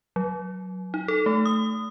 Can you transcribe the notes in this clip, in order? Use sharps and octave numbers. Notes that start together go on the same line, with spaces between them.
F#3
D#4
A4
A3
D#6